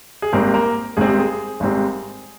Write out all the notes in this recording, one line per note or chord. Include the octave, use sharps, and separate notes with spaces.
G#4
G#1 G#2 G3 A#3 C4 A#4
A#3 A#4
G#1 G#2 G3 C4 G#4
G4
G#4
G#1 G#2 G3 C4